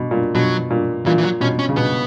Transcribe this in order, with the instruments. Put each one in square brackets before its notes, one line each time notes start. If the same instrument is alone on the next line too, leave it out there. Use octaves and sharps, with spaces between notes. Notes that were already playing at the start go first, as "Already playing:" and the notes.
Already playing: [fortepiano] B2
A#2
[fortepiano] B2 [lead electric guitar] F#3
[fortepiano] A#2
[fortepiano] A#2 [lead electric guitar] E3
[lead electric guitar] E3
F#3
[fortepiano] B2 [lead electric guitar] C#4
[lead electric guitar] C#4
[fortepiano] C#3
[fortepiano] B2 [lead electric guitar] B3